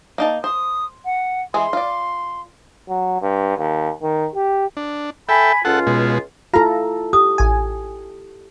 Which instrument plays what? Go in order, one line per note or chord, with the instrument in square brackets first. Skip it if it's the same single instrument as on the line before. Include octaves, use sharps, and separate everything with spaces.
[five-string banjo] A#3 D#4 A5
[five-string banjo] C5 [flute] D#6
[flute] F#5
[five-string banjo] E3 G#3 G#4 [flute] C6
[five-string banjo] F4 D5
[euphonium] F#3
G2
D#2
D#3
G4
[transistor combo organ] D4
[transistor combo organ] A4 E5 G5 [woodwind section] G#5 B5
[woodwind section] C#2 C#4 F4 [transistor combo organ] A4 F#5
[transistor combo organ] B2 G#3
[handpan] E4 A4 [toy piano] F4 [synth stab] F5 A#5
[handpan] G4 [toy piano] D#6
[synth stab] A1 G#5